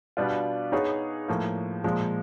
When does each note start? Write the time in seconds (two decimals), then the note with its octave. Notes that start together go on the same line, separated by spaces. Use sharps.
0.17 B2 G3 B3 D4 F4
0.72 B3 D#4 G#4 C#5
1.28 A2 F3 A#3
1.84 A#2 F3 G#3